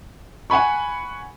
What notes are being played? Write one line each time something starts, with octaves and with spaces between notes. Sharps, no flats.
F#5 G#5 B5 C#6